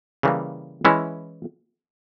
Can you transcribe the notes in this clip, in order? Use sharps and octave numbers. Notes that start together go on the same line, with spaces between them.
C#3 E3 G3 A#3
E3 G#3 C#4 E4